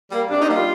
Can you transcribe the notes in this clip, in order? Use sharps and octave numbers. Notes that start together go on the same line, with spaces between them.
G3 A#3
C3 D4
D#4
G3 A#3
F4